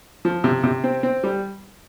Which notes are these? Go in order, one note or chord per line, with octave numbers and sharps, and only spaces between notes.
F3
C3
C3
C4
C4
G3